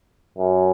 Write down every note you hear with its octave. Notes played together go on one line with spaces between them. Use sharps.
F#2